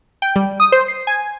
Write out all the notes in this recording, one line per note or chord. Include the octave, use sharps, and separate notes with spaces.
G5
G3
D#6
C5
C7
G#5